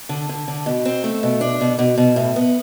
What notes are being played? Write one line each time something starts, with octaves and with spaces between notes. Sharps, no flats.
D3
D3
D3
B2
C4
A3
B2
D4
B2
B2
B2
A2
B3